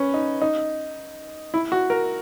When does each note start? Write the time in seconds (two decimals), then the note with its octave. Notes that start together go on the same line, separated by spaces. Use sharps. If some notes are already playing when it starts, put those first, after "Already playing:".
Already playing: C#4 B4
0.14 D#4
0.42 D#4
1.54 E4
1.72 F#4
1.90 A#4